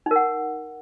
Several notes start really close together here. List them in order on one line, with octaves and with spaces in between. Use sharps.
D#4 A#4 F#5